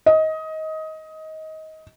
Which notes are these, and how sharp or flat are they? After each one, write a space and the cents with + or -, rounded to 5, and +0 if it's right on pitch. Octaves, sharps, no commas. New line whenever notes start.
D#5 +20